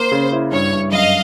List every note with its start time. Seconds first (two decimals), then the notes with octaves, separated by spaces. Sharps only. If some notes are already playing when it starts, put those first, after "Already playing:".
Already playing: A#3 C5
0.12 C#3
0.32 E4
0.52 G2 C#5
0.73 G2
0.92 F#2 D#5 F5